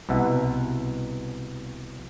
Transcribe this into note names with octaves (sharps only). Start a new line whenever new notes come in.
C2 B2 E5 F#5